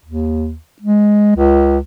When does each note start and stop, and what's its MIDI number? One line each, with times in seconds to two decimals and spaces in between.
0.05 0.55 39
0.82 1.34 56
1.36 1.79 37